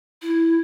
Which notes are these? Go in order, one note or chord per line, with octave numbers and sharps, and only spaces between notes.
E4